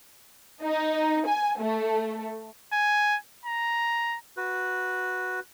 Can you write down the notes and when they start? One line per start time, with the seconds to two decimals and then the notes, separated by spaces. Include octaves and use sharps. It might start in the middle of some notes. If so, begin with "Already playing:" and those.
0.62 D#4
1.27 G#5
1.60 A3
2.73 G#5
3.46 A#5
4.37 F#4 B4